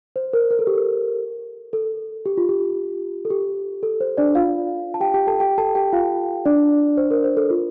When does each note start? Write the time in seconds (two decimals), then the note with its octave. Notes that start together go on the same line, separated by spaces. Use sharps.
0.16 C5
0.33 A#4
0.51 A#4
0.59 A4
0.67 G4
0.75 A4
1.73 A4
2.26 G4
2.37 F4
2.49 G4
3.25 A4
3.30 G4
3.83 A4
4.01 C5
4.17 D4 D5
4.35 F4 F5
4.94 A5
5.00 G4 G5
5.14 G4 G5
5.27 A4 A5
5.40 G4 G5
5.58 A4 A5
5.75 G4 G5
5.93 F4 F5
6.45 D4 D5
6.97 C5
7.11 A#4
7.24 C5
7.37 A4
7.50 F4